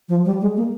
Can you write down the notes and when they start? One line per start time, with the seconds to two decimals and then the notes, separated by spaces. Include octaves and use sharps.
0.09 F3
0.25 G3
0.41 G#3
0.57 A#3